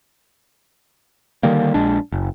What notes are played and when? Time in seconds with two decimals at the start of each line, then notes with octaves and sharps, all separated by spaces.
1.43 D3 D#3 G3 A#3
1.74 A#1 G#3 D4
2.12 F#1